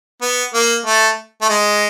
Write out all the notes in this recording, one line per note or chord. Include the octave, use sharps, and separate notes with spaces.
B3
A#3
A3
A3
G#3